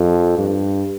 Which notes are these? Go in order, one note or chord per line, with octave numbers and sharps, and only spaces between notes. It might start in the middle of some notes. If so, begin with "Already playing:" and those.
Already playing: F2
G2